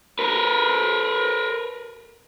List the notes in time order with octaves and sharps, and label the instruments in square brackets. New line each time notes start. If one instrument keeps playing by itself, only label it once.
[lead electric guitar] A#4 B4